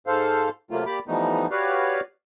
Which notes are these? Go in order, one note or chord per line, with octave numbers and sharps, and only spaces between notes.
G#2 A4 C5 F5
C3 F#3 A3 A#3 F4
A#3 G4 D5 B5 D6
E3 F3 G3 A3 B3 D#4
F#4 G4 B4 C#5 D5 F5